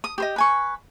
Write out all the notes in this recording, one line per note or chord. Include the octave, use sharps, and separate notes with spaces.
D#6
G4 C5 D#5
B4 G#5 C#6